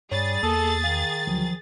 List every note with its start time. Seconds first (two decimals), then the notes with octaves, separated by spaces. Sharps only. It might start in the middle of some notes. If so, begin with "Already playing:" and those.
0.12 G2 G3 G#4 C#5 A6
0.43 E2 A#3 A4 D#6
0.84 D#3 F5
1.27 D2 F3 F#3